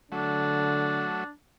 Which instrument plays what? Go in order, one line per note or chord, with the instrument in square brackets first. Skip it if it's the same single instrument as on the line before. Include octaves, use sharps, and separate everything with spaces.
[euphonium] D3 [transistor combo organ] F#3 A3 [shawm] D4